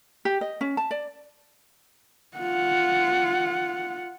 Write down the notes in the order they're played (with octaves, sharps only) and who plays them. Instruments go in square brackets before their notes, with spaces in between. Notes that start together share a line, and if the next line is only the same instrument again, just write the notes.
[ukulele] G4
D#5
C#4
A5
D5
[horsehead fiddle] F4 F#5